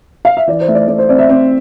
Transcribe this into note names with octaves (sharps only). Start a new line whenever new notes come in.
F5
E5
E3 D5
C5
A3 E5
D5
A3 D5
C5
C4 D5
E5
C4